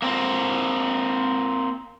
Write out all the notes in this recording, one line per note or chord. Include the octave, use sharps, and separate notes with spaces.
A#3 C4